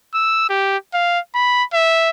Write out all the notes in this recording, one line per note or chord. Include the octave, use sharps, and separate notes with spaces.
E6
G4
F5
B5
E5